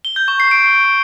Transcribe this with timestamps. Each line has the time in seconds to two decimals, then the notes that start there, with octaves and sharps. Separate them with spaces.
0.05 G7
0.16 G6
0.28 C#6
0.40 C7
0.51 D7